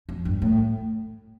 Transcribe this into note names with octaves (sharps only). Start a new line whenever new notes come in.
F2
G2
A2